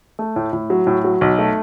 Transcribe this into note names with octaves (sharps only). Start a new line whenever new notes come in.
A3
A2
A2
F#3
A2
F#3
B1
A3